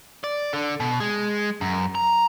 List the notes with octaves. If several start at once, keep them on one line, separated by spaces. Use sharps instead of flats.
D5
D3
B2
G#3
F#2
A#5